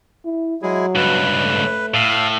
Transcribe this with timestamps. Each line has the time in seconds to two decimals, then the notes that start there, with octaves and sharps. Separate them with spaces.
0.25 E4
0.62 F#3 G#3 E4 G#4
0.95 C#2 G2 B4
1.43 A3
1.94 A2 A4 F5